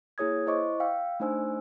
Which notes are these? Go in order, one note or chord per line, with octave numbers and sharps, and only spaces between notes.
A#3 E4 G#4 C#5 D#6 G#6
E4 C5 D#5 C#6 D6
F5 G5 E6
A3 D4 D#4 C5 G#5 E6